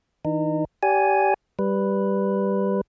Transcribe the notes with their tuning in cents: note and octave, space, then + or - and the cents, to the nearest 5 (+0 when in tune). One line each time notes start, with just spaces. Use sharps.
E3 -45 D#4 -30
G4 -15 D5 -35 G#5 +0
G3 +0 B4 +0